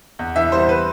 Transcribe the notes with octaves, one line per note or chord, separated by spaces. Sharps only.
E2
E3 E5
G3 C5
B4